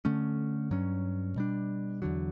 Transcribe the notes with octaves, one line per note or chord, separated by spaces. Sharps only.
D3 A3 C#4
G2 F#3 C#4
B2 G3 D4
E2 D3 F#3